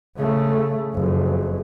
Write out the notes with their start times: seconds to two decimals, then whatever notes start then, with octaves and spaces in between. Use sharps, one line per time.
0.17 C#3 A3
0.95 F#1 F2